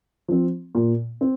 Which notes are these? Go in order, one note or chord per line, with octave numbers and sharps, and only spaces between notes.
F3 C4
A#2
C4